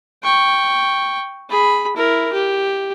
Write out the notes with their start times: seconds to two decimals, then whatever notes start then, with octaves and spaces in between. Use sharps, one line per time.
0.23 G5 C#6
1.50 G#4 B5
1.96 E4 A#4
2.33 G4